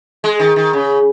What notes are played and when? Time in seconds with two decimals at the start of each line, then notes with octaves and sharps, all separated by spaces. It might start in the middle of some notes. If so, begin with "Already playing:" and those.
0.24 G#3
0.40 D#3
0.56 D#3
0.73 C#3